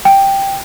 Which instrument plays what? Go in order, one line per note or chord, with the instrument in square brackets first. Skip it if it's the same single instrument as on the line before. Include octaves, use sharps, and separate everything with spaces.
[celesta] G5